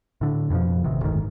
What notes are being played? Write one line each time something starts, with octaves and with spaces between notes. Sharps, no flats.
A2 D3
F2 B2 D3 F3
A1 C3 D#3
F#1 D2 G#2 D#3